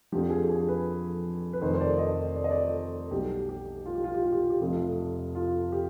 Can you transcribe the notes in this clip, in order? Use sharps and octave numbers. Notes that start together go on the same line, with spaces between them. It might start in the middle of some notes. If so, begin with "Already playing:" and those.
F2 D3 F3 G4
G#4
G#4
B4
B4
F1 F2 D#3 C5
C5
D5
D#5
D5
D#5
D5
B1 B2 G3 G4
G4
F4
G4
F4
G4
F4
G4
F4
G4
F1 F2 C3 F4
F4
G4